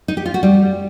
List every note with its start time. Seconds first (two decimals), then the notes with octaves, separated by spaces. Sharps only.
0.08 D#4
0.17 G4
0.26 F4
0.34 F#4
0.43 G3